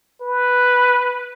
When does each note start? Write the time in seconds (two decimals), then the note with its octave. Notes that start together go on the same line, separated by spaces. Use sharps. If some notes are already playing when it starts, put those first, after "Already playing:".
0.21 B4